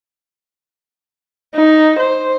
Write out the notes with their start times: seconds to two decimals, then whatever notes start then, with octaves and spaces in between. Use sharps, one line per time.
1.55 D#4
1.99 C5